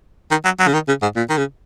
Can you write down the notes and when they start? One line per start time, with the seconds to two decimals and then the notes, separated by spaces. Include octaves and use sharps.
0.31 D#3
0.45 F#3
0.59 F#3
0.67 C#3
0.73 D#3
0.88 C#3
1.02 G#2
1.16 A#2
1.29 D#3
1.37 C#3